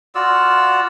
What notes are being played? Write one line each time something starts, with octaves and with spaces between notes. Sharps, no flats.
F4 F#4 D5 E6